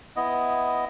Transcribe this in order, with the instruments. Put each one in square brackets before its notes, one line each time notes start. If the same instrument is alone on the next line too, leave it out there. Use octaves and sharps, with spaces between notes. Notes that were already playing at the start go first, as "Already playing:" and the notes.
[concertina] B3 E4 D#5